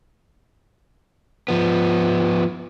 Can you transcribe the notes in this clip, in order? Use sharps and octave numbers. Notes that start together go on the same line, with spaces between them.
F3 B3